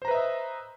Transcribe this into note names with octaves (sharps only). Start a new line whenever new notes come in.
B4 C5 D#5 E5 A#5